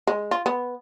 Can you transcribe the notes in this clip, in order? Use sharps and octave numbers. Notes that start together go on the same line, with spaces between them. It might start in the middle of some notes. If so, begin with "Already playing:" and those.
G#3
F4
B3